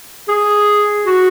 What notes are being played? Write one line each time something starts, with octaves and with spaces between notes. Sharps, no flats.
G#4
F#4